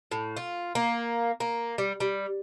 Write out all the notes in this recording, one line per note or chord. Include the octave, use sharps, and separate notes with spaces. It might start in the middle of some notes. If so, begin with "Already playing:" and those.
A2
F4
A#3
A#3
G3
G3